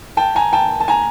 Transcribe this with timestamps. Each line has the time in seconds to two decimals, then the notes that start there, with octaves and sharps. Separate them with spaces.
0.17 G5 A5
0.35 G#5 A#5
0.53 G5 A5
0.80 A5
0.88 G#5 A#5